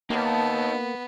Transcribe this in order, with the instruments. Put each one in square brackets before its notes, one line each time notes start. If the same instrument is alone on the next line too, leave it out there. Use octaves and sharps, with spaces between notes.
[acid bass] A#3 [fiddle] B3 [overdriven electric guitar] D#4 G4 [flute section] A5